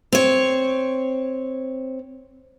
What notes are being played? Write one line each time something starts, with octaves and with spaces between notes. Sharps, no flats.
C4 C#5